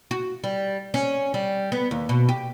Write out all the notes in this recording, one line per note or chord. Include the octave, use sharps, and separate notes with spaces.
F#4
G3
C#4
G3
B3
D#2
B2
G4